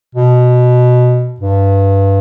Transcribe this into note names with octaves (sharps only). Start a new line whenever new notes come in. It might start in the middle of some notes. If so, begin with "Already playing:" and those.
B2
G2